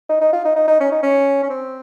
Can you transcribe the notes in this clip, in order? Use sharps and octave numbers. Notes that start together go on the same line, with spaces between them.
D#4
D#4
F4
D#4
D#4
D#4
C#4
D#4
C#4
C#4
C4